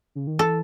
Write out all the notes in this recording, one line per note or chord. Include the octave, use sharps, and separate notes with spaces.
C#3
D#3
E3 A4